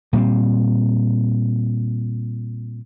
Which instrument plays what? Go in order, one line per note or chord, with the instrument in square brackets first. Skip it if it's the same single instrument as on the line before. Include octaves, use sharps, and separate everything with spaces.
[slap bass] A#2 G3 A#3 C4